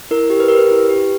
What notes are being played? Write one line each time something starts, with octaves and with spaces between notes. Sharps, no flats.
E4 A#4
G4
B4
G4 A#4
B4
E4
G4